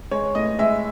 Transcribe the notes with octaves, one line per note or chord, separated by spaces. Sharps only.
G#3 C#5
A2 D#5
G#3 E5